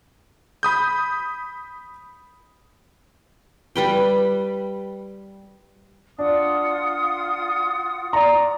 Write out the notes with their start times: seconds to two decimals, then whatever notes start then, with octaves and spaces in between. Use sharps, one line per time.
0.63 B5 D#6 G6
3.76 G3 B4 G5
6.19 D4 F4 F#5 D#6
8.13 D5 A#5